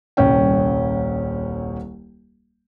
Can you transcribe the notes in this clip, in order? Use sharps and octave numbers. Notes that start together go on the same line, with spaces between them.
D#1 C2 C#4 G5